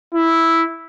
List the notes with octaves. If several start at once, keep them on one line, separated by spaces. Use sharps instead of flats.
E4